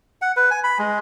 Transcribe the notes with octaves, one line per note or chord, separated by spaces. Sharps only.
F#5
B4
G#5
B5
G#3